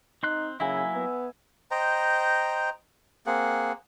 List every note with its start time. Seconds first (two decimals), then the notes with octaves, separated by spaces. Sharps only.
0.23 C4 D#4 C6 F#6
0.60 C#3 F#3 A#3 E4 E5 G#5
0.95 B3
1.71 C5 D#5 G5 A#5
3.26 A#3 C4 G#4 F#5